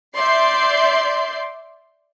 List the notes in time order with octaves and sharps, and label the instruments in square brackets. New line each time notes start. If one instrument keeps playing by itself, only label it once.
[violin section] D5 E5 C6 G6 C7